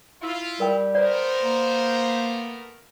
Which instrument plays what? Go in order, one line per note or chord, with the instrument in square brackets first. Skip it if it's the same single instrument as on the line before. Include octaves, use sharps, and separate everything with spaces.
[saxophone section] E4 [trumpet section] F4
[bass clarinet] G3 [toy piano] A#4 G5
[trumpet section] A3 B3 A#4 [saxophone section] C5 [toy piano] D5
[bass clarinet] A#3